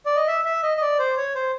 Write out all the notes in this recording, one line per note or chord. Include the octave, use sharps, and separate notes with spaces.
D5
D#5
E5
E5
D#5
D#5
D5
C5
C#5
C5